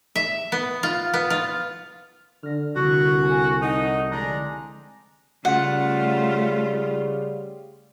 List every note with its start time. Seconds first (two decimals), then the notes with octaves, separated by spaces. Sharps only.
0.16 E5
0.52 B3
0.83 F4
1.14 B3
1.30 F4
2.43 D3 F6 A#6
2.76 C2 D3 F#4
3.22 G#5 A#5
3.61 A3 D#4 F#5
4.11 G#3 C4 D4 A#5
5.45 C#3 G3 A3 F4 F#5